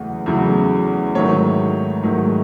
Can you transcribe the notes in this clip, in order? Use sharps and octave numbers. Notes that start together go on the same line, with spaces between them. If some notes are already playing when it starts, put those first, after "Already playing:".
Already playing: E2 C#3 F#3 A3
E2 C#3 F#3 A3
G#2 D#3 F#3 A3 C#5
G#2 D#3 F#3 A3